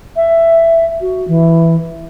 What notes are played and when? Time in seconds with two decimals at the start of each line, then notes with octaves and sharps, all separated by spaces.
0.16 E5
1.01 F#4
1.28 E3